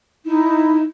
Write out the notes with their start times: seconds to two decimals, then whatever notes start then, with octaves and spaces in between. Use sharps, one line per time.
0.24 D#4 E4